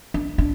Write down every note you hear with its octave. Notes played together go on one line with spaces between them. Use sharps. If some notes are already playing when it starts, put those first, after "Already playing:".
D4
D4